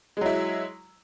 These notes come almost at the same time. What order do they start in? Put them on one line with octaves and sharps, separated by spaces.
G#3 F#3 E4